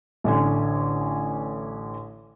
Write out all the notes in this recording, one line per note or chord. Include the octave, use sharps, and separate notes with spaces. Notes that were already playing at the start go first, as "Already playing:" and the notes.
A1 D3 G#5